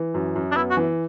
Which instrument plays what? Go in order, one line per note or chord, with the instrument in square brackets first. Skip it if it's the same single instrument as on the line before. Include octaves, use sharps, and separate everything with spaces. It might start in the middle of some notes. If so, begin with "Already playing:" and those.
Already playing: [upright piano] E3
F#2
F#2
[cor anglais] D4
[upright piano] B3 [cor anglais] E4
[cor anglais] F#4
[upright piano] E3